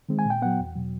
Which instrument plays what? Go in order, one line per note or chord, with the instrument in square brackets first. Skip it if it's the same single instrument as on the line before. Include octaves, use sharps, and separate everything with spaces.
[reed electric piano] D#3 G#3 C4
G#5
A#2
G5
F#3 B3 F#5
E2
B2 F#3